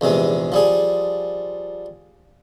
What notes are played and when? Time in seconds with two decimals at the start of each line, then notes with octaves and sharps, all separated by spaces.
0.01 A#1 E2 C3 G#3
0.52 F3 G3 G#4